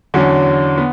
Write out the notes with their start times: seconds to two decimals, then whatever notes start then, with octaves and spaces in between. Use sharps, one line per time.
0.14 E2 D3 F#3 C#4
0.77 B3